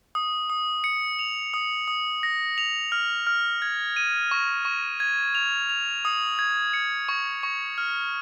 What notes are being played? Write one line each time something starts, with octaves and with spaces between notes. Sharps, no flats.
D#6
D#6
C#7
F7
D#6
D#6
A#6
F7
F6
F6
G#6
D#7
C#6
C#6
G#6
F7
F7
D#6
G#6
C#7
C#6
C#6
F6